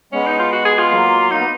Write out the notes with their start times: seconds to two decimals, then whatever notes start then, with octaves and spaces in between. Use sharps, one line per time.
0.12 G#3 B3 C#4
0.27 D#4
0.39 F4
0.53 F#4
0.65 G#4
0.79 F4
0.91 F#3 A#3
1.31 A#3 D#4
1.38 B3